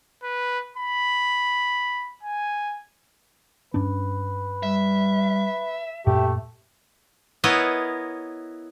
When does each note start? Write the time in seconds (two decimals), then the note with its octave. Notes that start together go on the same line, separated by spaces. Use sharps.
0.23 B4
0.77 B5
2.23 G#5
3.74 G2 C#4 D4 B4
4.63 G3 E5
6.07 F#2 A#2 A3 G4
7.44 B3 E4 A#4 B4 C#5 D#5